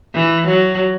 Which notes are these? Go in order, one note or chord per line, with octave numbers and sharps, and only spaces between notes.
E3
F#3